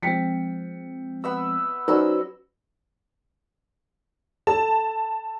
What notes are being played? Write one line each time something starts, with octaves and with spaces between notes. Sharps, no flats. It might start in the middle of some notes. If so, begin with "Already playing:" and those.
F3 G#3 C4 G5 B6 C#7
B3 E5 E6
F#3 C#4 D#4 B4 C5 D5 E6
A4 A5